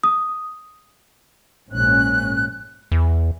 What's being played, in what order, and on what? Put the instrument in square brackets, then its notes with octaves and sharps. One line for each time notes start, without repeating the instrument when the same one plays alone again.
[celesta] D#6
[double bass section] A#1 G#2 C#4 [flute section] F#6
[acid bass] E2